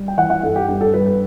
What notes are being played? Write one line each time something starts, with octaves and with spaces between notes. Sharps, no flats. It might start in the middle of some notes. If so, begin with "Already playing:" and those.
Already playing: G3
G5
E3 F#5
F#5
G2 A4
G4
G2 G4
A4
G3 B4
B4